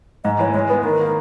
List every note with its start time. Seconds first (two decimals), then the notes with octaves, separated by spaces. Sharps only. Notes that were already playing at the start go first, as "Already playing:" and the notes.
0.24 G#2 D#5
0.39 E3 C#5
0.54 G#3 C#5
0.69 B3 B4
0.84 D#3 A#4
1.00 A#3